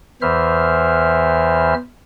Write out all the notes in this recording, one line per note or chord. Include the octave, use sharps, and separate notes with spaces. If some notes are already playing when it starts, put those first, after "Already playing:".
E2 E3 C5 E5 F6